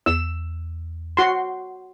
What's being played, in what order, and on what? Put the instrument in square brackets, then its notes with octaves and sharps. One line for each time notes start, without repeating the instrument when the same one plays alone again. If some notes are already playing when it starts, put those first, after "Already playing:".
[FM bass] E2 [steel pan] E6
[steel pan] F#4 C6